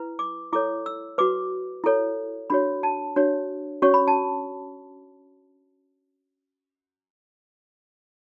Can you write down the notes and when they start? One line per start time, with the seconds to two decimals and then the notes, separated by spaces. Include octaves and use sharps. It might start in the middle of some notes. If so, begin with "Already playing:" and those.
Already playing: E4 B4
0.19 D6
0.52 E4 A4 C#5 D6
0.86 E6
1.18 F#4 B4 D6
1.84 E4 A4 C#5
2.50 D4 F#4 C#5 B5
2.83 A5
3.16 D4 F#4 C#5
3.82 C#4 F#4 C#5 C#6
3.94 B5
4.08 A5